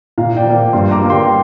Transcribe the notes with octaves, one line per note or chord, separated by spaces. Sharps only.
A#2 F5 A#5
D5 G5
F3 A#3
G2 G5 C6
A#5 D6
G3 A#3
G5 C6